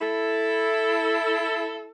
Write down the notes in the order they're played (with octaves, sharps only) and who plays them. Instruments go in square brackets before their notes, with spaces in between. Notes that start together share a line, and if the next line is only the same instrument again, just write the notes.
[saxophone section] E4 A4